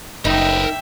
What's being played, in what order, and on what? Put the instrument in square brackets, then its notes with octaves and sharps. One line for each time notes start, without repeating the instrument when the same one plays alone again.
[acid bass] F#1 [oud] D#4 [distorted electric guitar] A#4 B4 [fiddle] E5 G5